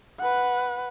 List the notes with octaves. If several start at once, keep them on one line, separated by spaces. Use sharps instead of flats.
B4 F#5